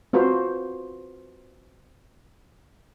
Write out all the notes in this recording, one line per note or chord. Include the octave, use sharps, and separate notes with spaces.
C4 F4 F#4 B4 C5